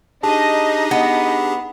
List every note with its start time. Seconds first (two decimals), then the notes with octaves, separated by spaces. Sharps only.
0.23 D4 D#4 G4 G#4 D#5 A5
0.91 B3